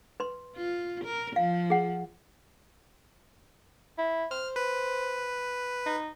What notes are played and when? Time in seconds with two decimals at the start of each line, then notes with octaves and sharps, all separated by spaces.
0.20 B4 C6
0.56 F4
1.05 A#4
1.36 F3 F5
1.70 G#4 F#5
3.98 E4
4.31 C5 F6
4.56 B4
5.86 D#4